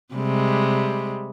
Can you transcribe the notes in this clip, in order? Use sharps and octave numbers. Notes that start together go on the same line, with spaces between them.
C3 G3 G#3